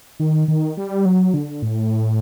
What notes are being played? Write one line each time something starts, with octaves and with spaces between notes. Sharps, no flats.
D#3
D#3
G3
F#3
D3
A2